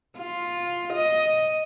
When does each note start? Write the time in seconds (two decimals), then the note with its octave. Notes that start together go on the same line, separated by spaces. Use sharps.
0.19 F4
0.94 D#5